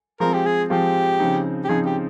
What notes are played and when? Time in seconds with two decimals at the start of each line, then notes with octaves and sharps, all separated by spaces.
0.20 F3 G#3 C4 F4 A#4
0.33 G4
0.46 G#4
0.70 F3 G#3 C4 F4 G4
1.20 C#3 F3 C4 D#4
1.64 G4
1.69 C#3 F3 C4 D#4 G#4
1.86 G4